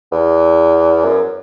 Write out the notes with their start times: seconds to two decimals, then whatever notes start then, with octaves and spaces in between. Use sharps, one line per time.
0.12 E2
1.04 F#2